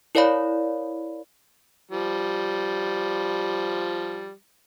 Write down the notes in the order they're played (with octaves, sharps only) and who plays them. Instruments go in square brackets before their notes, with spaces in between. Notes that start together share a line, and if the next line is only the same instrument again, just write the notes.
[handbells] E4 A#4 C#5 D5 F5 B5
[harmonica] F3 G3